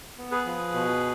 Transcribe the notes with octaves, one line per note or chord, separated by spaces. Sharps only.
B3
G#4 B4
F3
B2